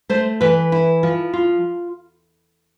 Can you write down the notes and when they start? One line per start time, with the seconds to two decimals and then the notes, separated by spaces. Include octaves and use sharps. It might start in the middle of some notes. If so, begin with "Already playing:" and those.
0.09 A3 C5
0.41 E3 B4
0.72 E4
1.03 F3
1.33 F4